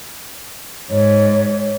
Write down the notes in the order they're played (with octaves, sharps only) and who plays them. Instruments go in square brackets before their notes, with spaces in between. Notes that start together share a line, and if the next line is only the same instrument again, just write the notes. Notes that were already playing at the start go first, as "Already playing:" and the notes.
[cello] G#2 [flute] C#5